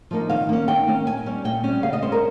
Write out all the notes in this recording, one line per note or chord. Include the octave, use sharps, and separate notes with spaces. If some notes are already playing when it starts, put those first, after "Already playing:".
F3 A#3 D#4
D#3 F5
A#3 C#4
D#3 G5
A#3 C#4
A#2 G#5
G3 C#4
A#2 G5
G3 C#4
C#3 F5
D#5
G3 C#4 C5
A#4